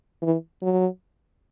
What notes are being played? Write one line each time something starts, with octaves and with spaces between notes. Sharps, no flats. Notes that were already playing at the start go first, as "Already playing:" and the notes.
E3
F#3